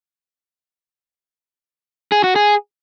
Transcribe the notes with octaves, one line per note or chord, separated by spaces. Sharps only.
G#4
F#4
G#4